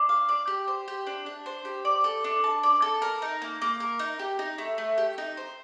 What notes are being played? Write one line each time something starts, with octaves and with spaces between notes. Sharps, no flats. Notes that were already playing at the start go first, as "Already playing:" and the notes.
Already playing: D4
F5
D5
G4
C5
G4
D4
D4
C5
G4
D5
A4
D4
A5
D5
A4
A#4
D#4
A#3
A#3
A#4
D#4
G4
D#4
A3
A3
G4
D#4
C5